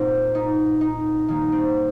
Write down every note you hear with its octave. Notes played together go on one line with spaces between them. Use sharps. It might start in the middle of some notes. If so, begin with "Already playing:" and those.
Already playing: A#2 A#3 C4 D#4
D#4
D#4
D#3 G3 A#3 D#4
C4